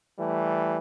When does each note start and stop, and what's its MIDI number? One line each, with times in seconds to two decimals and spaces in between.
0.18 0.77 52
0.18 0.77 55
0.18 0.77 57